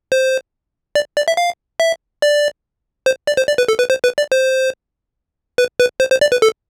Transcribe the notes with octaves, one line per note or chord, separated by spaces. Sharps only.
C5
D5
D5
E5
F5
E5
D5
C5
D5
C5
D5
B4
A4
B4
C5
B4
D5
C5
B4
B4
C5
C5
D5
B4
A4